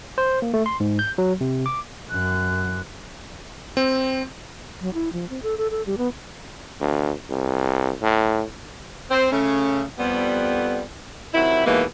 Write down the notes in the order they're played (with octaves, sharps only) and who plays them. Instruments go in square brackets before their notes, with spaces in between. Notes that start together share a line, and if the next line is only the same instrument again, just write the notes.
[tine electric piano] C5
A#3
A3
C6
G#2
G6
F#3
C3
D6
[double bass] F#2 [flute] F#6
[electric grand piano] C4
[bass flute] F#3
E4
F3
C4
A4
A4
A4
G3
B3
[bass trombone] D2
C2
A2
[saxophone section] C4
C#3 A3 C#4
F2 G3 B3
C3 D#3 F#3 E4
D#2 B2 D#3 E3 G#3 A#3